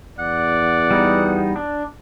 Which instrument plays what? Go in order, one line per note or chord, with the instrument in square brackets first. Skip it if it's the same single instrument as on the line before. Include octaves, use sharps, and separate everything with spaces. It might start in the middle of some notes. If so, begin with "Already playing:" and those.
[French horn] E2 [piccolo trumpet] D5 [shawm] F#5
[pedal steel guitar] G3 B3 D#4
D4